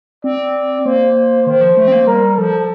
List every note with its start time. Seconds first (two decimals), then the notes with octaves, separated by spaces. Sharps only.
0.24 C4 D5
0.85 A#3 C5
1.46 D#3 C5
1.61 F3
1.77 A3
1.88 C4
1.92 A#3
2.07 G3 A#4
2.37 F3 A4